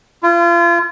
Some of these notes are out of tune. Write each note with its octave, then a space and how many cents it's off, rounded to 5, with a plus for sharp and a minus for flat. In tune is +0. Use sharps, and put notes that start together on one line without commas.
F4 -35